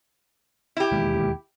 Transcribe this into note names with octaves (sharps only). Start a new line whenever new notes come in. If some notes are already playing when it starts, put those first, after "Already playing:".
E4 G4
E1 D#2 G#3